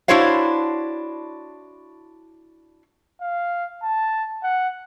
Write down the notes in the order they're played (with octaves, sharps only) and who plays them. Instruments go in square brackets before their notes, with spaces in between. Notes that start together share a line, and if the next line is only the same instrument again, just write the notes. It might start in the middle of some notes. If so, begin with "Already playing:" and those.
[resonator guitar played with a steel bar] D4 E4 F#4 C5 C#5 F5
[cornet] F5
A5
F#5